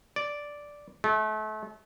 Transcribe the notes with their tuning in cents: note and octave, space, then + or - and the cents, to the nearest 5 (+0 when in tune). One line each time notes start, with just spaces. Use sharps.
D5 -5
A3 -35